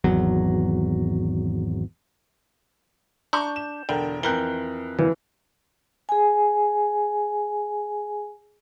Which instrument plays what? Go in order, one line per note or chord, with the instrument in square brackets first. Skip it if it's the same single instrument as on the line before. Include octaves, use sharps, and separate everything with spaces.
[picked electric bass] G#1 E2 F#3
[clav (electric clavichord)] D4 [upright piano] A#5 C#6 G6
[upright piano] E7
[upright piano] E1 A#4 G5 [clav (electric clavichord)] D3
[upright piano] F2 F#6 G7 [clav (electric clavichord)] E3 A#4 G5
[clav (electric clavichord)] A#2 [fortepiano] E3
[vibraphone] G#4 G#5